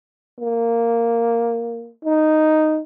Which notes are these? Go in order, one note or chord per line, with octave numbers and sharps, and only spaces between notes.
A#3
D#4